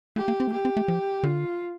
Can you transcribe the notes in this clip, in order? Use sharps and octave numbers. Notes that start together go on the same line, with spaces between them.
A3 G4
A#3
C4
A3
A#3 G4
C4
A3
F3
D3 F4